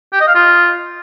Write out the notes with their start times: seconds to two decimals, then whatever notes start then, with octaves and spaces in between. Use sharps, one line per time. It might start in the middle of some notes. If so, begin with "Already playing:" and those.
0.13 G4
0.20 D#5
0.27 F5
0.35 F4